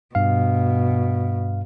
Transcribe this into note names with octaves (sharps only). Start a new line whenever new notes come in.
G2 B2 F5